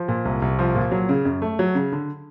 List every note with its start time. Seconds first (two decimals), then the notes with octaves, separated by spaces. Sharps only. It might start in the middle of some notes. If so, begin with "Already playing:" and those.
Already playing: F3
0.08 A#2
0.25 C2
0.42 C2
0.59 F3
0.75 A#2
0.92 F#3
1.09 C#3
1.25 F#2
1.42 A3
1.59 F#3
1.75 C#3
1.92 D3